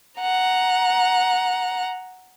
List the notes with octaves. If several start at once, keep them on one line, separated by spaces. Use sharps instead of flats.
F#5 A#5